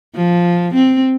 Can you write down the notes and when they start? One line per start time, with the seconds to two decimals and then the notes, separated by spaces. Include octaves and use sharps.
0.15 F3
0.74 C4